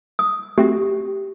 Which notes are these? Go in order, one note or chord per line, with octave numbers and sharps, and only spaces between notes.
D#6
A3 C4 F#4 G4